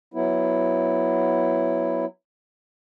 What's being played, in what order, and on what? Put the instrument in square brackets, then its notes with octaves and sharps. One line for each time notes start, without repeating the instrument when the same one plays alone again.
[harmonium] F#3 B3 E4